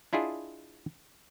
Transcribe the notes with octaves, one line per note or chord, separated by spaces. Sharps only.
D4 E4 F4 G#4 D#5